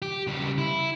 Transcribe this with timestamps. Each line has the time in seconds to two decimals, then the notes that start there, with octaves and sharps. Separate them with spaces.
0.02 G4
0.27 C#3 G3
0.58 E4